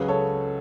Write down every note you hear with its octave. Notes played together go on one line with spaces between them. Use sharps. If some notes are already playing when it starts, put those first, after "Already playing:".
Already playing: C#2 C#3 F#3 G#4 B4
A4 C#5